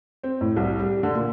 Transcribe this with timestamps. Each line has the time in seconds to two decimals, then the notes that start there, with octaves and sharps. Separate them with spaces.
0.23 C4
0.41 A2
0.56 C2
0.79 G3
1.03 D3
1.15 A#2